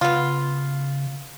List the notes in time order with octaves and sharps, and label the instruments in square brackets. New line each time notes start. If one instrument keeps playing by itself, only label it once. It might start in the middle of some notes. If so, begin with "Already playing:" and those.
[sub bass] C#3 [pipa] B3 F4